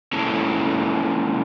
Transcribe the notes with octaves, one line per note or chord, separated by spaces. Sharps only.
G#3 A#3 C#4 E4 A4